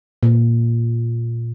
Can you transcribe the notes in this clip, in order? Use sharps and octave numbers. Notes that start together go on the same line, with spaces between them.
A#2